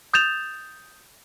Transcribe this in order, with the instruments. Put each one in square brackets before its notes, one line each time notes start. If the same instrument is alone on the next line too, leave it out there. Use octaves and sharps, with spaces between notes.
[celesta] D#6 G6 A6 E7 F7